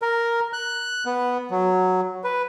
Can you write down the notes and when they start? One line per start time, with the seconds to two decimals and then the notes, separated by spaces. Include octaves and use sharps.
0.02 A#4
0.53 F#6
1.06 B3
1.51 F#3
2.24 B4